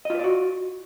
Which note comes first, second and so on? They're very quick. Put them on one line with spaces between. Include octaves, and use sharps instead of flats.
D#5 F4 B4 D5 F#4